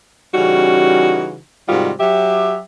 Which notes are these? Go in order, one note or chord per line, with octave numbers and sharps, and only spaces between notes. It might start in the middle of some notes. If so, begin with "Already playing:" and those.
C#3 E3 G3 C#4 D#4 F#4
G#2 C3 D#3 G3 F4 F#4
F#3 G4 E5